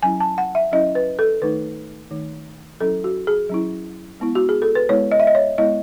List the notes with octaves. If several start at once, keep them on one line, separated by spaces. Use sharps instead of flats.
F#3 C#4 E4 G#5
A5
F#5
E5
F#3 C#4 E4 D#5
B4
A4
D#3 A3 D#4 B4
D#3 A3 D#4
F#3 C#4 E4 A4
F#4
G#4
F#3 C#4 E4
G#3 B3 E4
F#4
G#4
A4
B4
G#3 B3 E4 C#5
D#5
E5
D#5
C#5
G#3 B3 E4 D#5